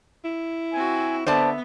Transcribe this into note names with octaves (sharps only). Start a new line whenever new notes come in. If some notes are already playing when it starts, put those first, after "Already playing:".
E4
C4 F#4 G#5
D3 B3 C5 D5 E5 A5